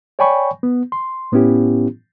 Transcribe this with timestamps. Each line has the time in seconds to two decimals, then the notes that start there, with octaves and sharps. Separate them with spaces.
0.19 C#5 D5 G5 G#5 B5 C#6
0.63 B3
0.92 C6
1.32 A2 B3 C#4 E4 G4